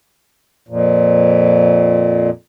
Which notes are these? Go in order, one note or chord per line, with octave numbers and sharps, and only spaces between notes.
F2 A#2